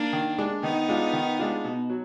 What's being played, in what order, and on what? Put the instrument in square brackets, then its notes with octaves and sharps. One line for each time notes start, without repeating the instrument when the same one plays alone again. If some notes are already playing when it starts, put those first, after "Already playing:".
Already playing: [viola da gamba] A#3 D4
[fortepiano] D#3
G#3 D4
[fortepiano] D#3 [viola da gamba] B3 D#4
[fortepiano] G#3 D4 F4
D#3
G#3 D4 F4
B2
F#3